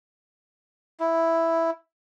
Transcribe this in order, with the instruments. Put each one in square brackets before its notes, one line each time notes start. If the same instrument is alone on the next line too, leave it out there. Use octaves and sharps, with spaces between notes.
[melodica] E4